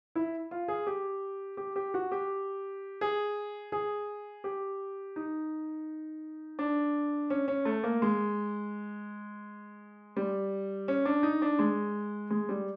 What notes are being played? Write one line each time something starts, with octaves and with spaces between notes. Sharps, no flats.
E4
F4
G#4
G4
G4
G4
F#4
G4
G#4
G#4
G4
D#4
D4
C#4
C#4
A3
A#3
G#3
G3
C#4
D4
D#4
D4
G#3
G#3
G3